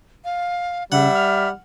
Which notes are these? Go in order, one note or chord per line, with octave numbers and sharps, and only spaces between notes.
F5
C#3 G3 E5 F#5
F6